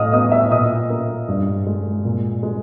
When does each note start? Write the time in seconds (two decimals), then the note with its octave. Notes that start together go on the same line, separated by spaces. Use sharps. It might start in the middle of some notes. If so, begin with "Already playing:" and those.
Already playing: A2 D#5 F5 D#6 F6
0.12 B3 D#5 D#6
0.32 E5 E6
0.51 A#2 D#5 D#6
0.90 A#3
1.28 G2
1.67 G#3
2.05 A#2
2.43 G#3